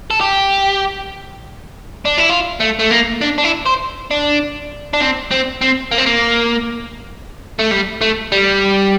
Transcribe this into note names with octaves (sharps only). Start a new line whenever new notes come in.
A4
G4
D4
E4
F4
A3
A3
A#3
D4
D4
E4
C5
D4
D4
C4
C4
C4
A#3
C4
A#3
A3
G3
A3
G3